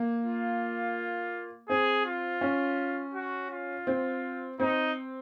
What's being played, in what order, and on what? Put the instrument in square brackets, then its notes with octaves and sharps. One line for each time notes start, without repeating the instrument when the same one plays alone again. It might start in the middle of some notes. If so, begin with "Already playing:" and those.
Already playing: [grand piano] A#3
[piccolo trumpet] F4
[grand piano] C4 [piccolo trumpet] G#4
[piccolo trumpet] F4
[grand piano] C#4
[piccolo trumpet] F#4
F4
[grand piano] C4
[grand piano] C4 [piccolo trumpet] D#4